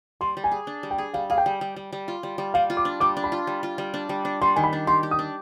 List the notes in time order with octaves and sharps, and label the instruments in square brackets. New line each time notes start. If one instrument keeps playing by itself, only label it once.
[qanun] G3 [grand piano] C6
[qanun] G3
[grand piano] G#5
[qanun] G#4
D4
G3
[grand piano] G5
[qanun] G#4
[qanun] G3 [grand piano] F5
[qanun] G#4 [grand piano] F5
[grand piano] G5
[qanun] G3
G3
G3
G3
F4
G3
G3
[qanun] G3 [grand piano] F5
[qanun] F4
[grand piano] D6
[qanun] D4
[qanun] G3 [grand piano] D6
[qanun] D4
[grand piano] B5
[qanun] F4
G3
F4
G3
D4
G3
D4
[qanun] G3 [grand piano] C6
[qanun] D#3 [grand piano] G#5
[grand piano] B5
[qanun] D4
[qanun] G4 [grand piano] C6
[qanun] G4
[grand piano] D#6
[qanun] D4